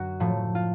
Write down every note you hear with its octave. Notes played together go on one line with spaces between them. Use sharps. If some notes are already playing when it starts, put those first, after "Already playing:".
Already playing: F#2 D3 D4 F#4
A2 F3 A3
F4